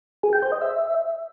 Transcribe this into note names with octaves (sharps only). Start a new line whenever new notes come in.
G#4
G5
C5
D#5
E5